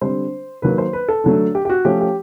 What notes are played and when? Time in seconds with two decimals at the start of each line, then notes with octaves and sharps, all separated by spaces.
0.01 D3 G3 C4 C5
0.62 D#3 F#3 A#3 B4
0.78 C5
0.93 B4
1.08 A4
1.24 D3 F#3 A3
1.55 G4
1.65 G4
1.70 F#4
1.85 F3 A3 C#4 F4 G4
2.01 G4